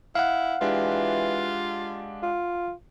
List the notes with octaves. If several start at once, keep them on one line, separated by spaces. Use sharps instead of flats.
E4 F5 F#5
E3 G#3 D4 F4 G4
F4